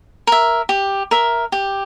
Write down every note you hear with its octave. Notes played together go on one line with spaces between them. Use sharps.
A#4 E5
G4
A#4 E5
G4